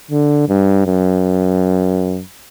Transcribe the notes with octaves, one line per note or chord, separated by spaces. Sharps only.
D3
G2
F#2